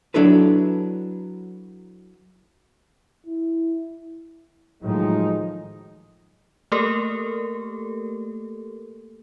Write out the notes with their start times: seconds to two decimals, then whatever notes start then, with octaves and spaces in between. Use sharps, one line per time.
0.14 F#3 D4 E4 A4 B4
3.26 E4
4.83 A2 D#3 F3 F#3 G#3 D#4
6.72 A3 A#3 G4 A4 A#4